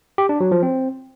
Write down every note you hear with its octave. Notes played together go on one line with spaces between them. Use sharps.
G4
D4
F#3
F3
C4